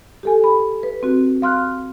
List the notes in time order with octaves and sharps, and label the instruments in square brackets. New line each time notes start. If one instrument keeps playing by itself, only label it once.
[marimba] G4 A4 G#5
B5
B4
C4 F#4
F5 C6 F6 F#6